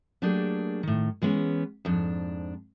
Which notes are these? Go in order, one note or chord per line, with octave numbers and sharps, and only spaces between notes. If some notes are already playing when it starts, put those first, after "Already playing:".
F#3 A3 A#3 D4 G4 G#4
A2 D#3
E3 G#3 B3 C#4
F2 G#2 D4